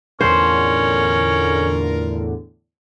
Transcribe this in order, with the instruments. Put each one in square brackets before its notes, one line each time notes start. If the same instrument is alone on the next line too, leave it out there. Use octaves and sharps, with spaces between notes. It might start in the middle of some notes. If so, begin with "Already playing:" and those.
[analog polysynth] E2 A2 D3 [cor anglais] C#4 [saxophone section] F4 A#4 [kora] C5